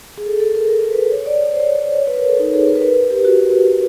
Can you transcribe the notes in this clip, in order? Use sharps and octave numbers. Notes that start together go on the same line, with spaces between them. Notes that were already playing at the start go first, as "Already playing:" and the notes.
G#4
A4
A4
A#4
A#4
B4
C#5
D5
C#5
C5
C#5
C#5
B4
A#4
A4
D#4
G#4
A#4
B4
A#4
G4
G4
F#4